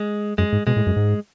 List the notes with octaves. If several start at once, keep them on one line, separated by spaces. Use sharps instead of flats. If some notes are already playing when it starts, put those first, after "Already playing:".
Already playing: G#3
F#2 G#3
G#2
B2 G#3
A2
F#2
G#2